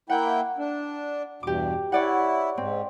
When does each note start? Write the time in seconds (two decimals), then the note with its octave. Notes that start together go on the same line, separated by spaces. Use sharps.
0.10 A#3 E4 F#5 G5
0.58 D4
1.43 E2 G2 B2 G4 D6
1.92 E4 C#5 D5 F#5
2.57 G#2 C4